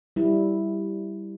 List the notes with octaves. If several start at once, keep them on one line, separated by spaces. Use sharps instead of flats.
G3 E4